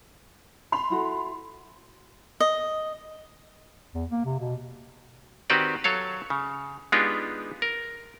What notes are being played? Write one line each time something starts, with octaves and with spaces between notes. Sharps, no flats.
B5 C6 F7
E4 F#4 A4
D#5
E2
A#3
C3
B2
D#3 C4 F#4 G4 B4 D5
F#3 A4 C#5 F5
C#3
G#3 B3 D4 D#4 F4 G4
A#4